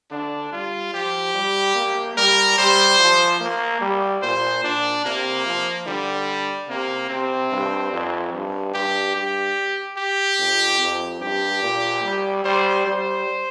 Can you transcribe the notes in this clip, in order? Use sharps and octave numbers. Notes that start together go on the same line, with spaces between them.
D3 D4
G3 F4
F3 G4
G3
A#3
G3 A#4
G3 C5
F3
A#3
G3
A#2 C5
A#2 D4
C3 A#3
F3
D3 G3
C3 A#3
C3 C4
G2
F2
G2
G2 G4
G2 G4
G4
F2
F2
G2 G4
A#2
G3
G3 C5
G3 C5